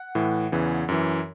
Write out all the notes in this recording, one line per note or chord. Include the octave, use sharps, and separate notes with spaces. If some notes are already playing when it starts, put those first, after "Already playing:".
Already playing: F#5
A2 E3
E2 C#3 E3
F#2 E3